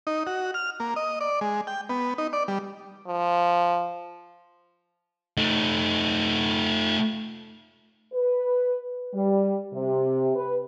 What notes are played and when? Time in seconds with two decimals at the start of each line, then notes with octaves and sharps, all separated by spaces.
0.07 D#4
0.27 F#4
0.54 F6
0.80 A#3
0.96 D#5
1.21 D5
1.41 G#3
1.67 G5
1.89 B3
2.18 D#4
2.33 D5
2.48 G3
3.07 F3
5.37 A3 D#4
8.13 B4
9.13 G3
9.73 C3
10.36 B4